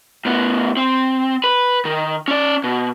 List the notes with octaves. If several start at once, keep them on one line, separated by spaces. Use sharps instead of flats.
A2 B3
C4
B4
D#3
C#4 D5
B2